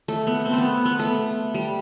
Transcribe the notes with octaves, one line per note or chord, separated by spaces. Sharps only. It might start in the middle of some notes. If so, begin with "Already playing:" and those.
A3
B3
C4
A3
B3
B3
A3
G3